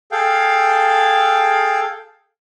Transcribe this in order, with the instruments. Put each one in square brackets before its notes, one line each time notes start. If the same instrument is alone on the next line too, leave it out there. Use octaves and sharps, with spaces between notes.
[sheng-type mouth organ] G#4 A4 F5 G5